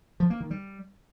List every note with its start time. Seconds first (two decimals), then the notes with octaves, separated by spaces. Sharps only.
0.20 F3
0.30 A#3
0.40 D#3
0.51 G3